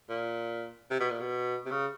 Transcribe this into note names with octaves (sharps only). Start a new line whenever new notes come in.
A#2
C3
B2
A#2
B2
C3
C#3